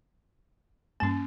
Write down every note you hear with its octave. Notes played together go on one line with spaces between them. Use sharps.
G2 A#3 C#4 A5 E7